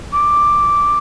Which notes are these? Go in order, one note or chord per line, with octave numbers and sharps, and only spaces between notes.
D6